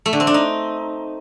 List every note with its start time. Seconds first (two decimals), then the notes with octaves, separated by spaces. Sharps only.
0.06 A3
0.13 D3
0.20 C4
0.27 D4
0.34 D#4